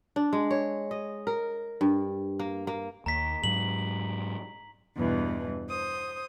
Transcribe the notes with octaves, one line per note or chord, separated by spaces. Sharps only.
D4
G#3
C#5
D#5
A#4
G2
A#3
A#3
D#2 A#5 B6
G#2 F#3 F#7
E2 G2 B2 E3
C5 D#6